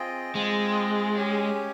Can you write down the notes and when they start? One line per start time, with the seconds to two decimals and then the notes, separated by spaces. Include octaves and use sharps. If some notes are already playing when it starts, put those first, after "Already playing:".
Already playing: C4 F4 G#4 D#5 G5
0.35 G#3 C4 F4 G#4 D#5 G5
1.17 C#4 G4 C#5 G#5